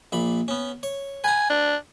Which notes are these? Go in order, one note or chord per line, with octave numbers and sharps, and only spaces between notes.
A#1 A#2 B5
B3 C#4
C#5
B4 G#5 A#5
D4